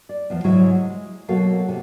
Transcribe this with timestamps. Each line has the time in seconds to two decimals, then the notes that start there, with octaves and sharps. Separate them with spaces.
0.09 D5
0.30 E2 F3
0.44 G#2 C#3 F#3 G#3 E4 F#4
0.75 G#3
1.28 B2 F#3 A#3 F#4 A4 F5
1.68 C3 A4